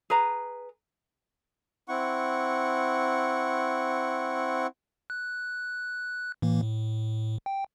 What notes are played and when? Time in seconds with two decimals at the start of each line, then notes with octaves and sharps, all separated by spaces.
0.10 G#4 B4 A#5
1.88 C4 E4 F#5 C#6
5.10 F#6
6.42 A2 E3 A#3
6.63 A2
7.46 G5